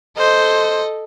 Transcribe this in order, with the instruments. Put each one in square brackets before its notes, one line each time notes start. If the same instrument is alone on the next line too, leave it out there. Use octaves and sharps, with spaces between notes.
[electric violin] A4 D#5 [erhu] C5